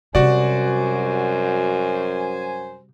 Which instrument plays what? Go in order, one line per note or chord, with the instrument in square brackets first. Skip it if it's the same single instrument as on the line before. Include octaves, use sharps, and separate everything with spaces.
[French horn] F#2 [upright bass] C3 G3 [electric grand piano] F#4 D5 [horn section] C5 G#5